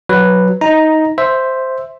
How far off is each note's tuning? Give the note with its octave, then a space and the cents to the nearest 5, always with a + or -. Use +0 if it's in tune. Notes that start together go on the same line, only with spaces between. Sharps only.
F#3 +0 B4 +0
D#4 +15 A#5 +5
C5 +0 E5 +0